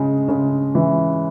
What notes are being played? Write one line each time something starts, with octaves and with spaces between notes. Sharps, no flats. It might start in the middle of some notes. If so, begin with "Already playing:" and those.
Already playing: C#3 G#3
C#3
E3